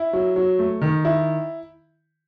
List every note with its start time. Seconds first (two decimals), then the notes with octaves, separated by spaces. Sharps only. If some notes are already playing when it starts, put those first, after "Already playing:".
Already playing: E4
0.13 F#3
0.36 F#3
0.59 A3
0.81 D#3
1.05 E4